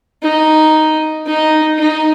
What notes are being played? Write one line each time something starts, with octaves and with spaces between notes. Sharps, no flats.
D#4
D#4
D#4